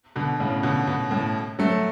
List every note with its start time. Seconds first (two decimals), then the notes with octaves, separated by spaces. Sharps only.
0.16 B2 D3
0.40 A2 C#3
0.63 B2 D3
0.87 B2
1.11 A2
1.59 F#3 A3